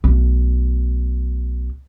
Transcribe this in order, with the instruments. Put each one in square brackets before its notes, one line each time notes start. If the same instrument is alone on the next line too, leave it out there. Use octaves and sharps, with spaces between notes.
[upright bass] B1 A3